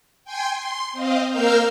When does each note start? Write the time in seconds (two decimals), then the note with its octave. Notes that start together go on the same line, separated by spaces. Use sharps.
0.24 G5 G#5 C6 G#6
0.55 C6
0.92 C4 D#5 F5
1.29 A#3 A#4 F5 E6 F6 G6